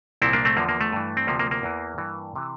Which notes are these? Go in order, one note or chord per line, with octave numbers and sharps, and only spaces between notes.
C2 A#2 F3 C4 E4
A#3 D4
A3 C4
E2 D3 F3 A#3
A#3
A3
G2 E3
C4
D2 C3 F3 A#3
A#3
A#3
E2 E3
G2 E3
C3 E3